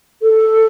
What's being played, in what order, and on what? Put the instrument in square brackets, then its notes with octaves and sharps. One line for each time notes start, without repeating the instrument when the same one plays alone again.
[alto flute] A4